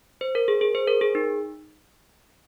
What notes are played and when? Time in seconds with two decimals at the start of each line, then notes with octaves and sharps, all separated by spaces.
0.21 C5
0.35 A#4
0.48 G#4
0.61 G#4
0.75 C5
0.88 A#4
1.01 G#4
1.15 D#4